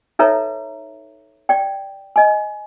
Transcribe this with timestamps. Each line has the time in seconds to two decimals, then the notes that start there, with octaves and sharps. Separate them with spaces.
0.19 D#4 A4 B4 C#5 E5 A#5
1.49 D5 G5
2.16 D#5 G#5